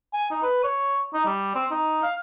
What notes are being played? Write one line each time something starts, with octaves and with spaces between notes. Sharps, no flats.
G#5
D#4
B4
C#5
D#4
G3
C4
D#4
F5